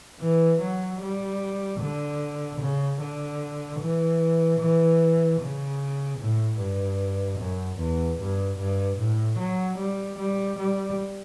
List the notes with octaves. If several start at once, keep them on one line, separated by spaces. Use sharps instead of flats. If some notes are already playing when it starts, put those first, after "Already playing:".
E3
F#3
G3
D3
C#3
D3
E3
E3
C#3
A2
G2
F#2
E2
G2
G2
A2
F#3
G3
G3
G3